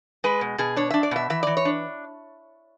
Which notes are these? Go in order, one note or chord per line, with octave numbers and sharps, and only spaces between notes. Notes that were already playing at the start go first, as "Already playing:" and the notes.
G#3 B4
B2
B2 G#4
D4 C#5
D4 E5
D5
B2 E5
E3 E5
E3 D5
C#5
D4